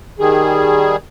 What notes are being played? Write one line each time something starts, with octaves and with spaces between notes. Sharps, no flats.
D#3 G3 G#4